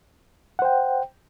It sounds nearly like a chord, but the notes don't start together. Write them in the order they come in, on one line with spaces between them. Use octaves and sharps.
F#5 C5 G5